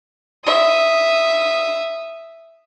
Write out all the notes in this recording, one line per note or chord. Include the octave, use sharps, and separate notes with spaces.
E5 D#6